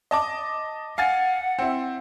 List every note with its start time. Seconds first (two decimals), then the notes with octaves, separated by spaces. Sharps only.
0.11 D#5 A5 D6
0.98 F5 F#5 G#5 A6
1.59 C4 E4